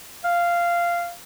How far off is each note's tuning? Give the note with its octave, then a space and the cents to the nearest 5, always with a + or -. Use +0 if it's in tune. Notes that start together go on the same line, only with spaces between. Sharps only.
F5 -10